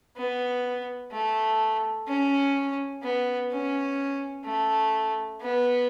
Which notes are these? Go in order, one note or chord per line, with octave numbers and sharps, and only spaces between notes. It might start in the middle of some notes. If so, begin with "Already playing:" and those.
B3
A3
C#4
B3
C#4
A3
B3